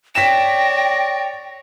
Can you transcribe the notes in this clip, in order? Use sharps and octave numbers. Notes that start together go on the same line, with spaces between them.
C#5 D5 G5 A#6 B6 E7